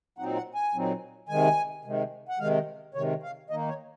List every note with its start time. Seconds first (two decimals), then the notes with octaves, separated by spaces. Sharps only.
0.18 A#2 F#3 C4 D#4 F#5
0.36 F#5
0.55 G#5
0.74 A#2 F#3 C4 D#4
1.29 C3 D#3 G#3 G#5
1.84 C3 D#3 G#3
2.29 F#5
2.39 C3 D#3 G#3 F5
2.94 C3 D#3 G#3 C#5
3.23 F5
3.50 D#3 A#3 D#4 D#5
3.68 C#5